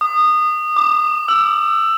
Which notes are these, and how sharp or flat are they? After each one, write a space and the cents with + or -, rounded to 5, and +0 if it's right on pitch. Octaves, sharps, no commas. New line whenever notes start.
D#6 -20
D6 +25
E6 +15